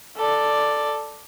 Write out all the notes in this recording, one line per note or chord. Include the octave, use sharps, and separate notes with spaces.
A4 D5